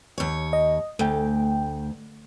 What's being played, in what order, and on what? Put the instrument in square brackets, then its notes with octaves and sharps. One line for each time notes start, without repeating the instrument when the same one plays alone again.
[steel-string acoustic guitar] D#2 C#5
[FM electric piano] D#5
[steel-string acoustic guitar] D2 [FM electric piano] A3 G5